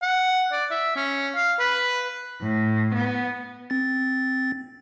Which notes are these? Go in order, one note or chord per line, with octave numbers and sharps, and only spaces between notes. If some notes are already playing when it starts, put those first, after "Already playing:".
F#5
D5
E5
C#4
F5
B4
A2
B3
C4 A6